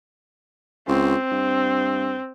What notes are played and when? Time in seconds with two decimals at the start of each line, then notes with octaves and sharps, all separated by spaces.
0.88 C#2 C4
1.32 G2